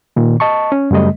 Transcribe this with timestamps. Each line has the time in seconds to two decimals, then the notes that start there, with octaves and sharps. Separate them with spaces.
0.16 A#2 D#3
0.40 D#5 A5 C#6
0.72 C#4
0.91 F#2 C#3 G3 A3 D#5